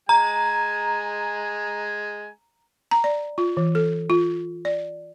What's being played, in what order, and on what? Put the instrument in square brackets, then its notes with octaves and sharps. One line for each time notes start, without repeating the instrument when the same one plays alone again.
[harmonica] G#3 G#5 [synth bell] A#5
[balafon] A#5
D5
F4
E3
A4
F4
D5